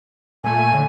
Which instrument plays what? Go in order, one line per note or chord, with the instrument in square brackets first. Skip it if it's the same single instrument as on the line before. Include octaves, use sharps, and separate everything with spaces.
[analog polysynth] A#2 A3 [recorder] G#5
[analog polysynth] A2 D3